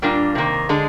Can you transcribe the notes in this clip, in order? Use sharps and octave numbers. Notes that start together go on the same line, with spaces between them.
A#2 G3 A#3 D4 F4
C3 D#3 A#3
D3 G#3 D4